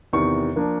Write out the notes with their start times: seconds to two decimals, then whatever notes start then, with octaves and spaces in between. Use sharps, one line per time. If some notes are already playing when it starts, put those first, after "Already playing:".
0.13 E2 C3 D#3 C#6
0.56 F3 A#3 D4